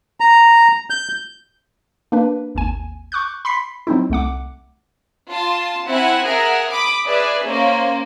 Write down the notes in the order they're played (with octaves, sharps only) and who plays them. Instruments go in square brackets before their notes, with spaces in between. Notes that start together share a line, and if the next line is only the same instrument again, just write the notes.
[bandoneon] A#5
G6
[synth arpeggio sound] A#3 D4 B4
G#1 D#2 G#5
C#6 D6 F#6 G6
B5 C6 B6 C7
F#3 C4 D#4 E4
C2 A3 F#5 D6
[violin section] F4 A5 C6
C4 E4 F#5 G#5
G#4 A#4 E5 F#5
B5 D6 D#6
G#4 B4 D5 E5
A#3 C#4 C5